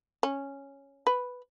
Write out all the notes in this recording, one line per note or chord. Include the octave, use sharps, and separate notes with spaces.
C#4
B4